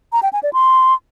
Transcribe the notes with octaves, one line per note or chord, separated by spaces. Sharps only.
A#5
G5
G#5
D5
C6